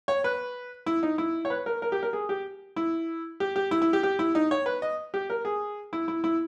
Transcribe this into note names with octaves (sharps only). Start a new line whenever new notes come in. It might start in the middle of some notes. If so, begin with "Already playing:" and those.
C#5
B4
E4
D#4
E4
C#5
B4
A#4
A#4
G4
A#4
G#4
G4
E4
G4
G4
E4
E4
G4
G4
E4
D#4
C#5
B4
D#5
G4
A#4
G#4
E4
E4
E4